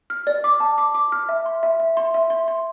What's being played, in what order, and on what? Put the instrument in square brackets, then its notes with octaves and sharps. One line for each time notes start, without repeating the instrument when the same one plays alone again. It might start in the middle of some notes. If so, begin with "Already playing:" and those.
[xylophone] F6
D5
D6
A5
D6
D6
F6
E5
C6
E5
E5
C6
E5
C6
C6